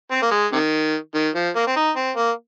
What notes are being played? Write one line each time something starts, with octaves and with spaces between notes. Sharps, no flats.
C4
A#3
G#3
C3 D#3
D#3
F3
A#3
C4
D#4
C4
A#3